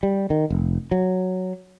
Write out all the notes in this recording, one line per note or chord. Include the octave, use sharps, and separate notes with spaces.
G3
D#3
F1
F#3